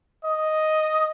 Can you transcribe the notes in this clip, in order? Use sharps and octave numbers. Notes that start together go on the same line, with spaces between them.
D#5